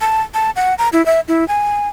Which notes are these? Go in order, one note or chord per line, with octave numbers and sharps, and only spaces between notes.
A5
A5
F#5
A#5
E4
E5
E4
G#5